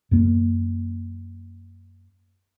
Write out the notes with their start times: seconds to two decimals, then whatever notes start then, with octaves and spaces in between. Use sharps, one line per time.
0.11 F#2 A#3